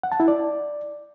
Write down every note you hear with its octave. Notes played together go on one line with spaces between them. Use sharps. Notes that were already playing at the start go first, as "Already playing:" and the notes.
F#5
A5
E4
D5